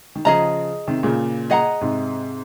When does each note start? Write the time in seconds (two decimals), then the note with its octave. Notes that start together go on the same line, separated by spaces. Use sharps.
0.16 D#3
0.25 C#3 F3 G#4 D#5 A#5
0.87 C3 D#3
1.03 A#2 C#3
1.50 G#4 D#5 F#5 A#5
1.81 G#2 C3